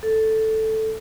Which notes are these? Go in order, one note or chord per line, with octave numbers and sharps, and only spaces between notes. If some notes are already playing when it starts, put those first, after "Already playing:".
A4